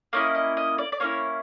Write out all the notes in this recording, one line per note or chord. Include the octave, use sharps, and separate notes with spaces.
A#3 C#4 E4 D#5
D#5
D#5
D5
D5
A#3 C#4 E4 C#5